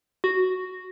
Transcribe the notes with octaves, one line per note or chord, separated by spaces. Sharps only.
F#4